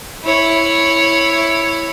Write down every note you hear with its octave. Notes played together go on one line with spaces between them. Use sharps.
E4 C#5